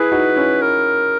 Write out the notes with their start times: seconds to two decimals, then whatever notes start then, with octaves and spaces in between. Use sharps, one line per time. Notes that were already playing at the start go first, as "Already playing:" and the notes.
Already playing: E4 G#4 B4
0.12 D#4 F#4
0.36 C#4 E4
0.62 A#4